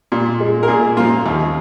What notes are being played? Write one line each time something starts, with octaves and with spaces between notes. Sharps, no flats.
A#2
G#3
A#4
A#2 G#4
F3 A#3 F4
D#2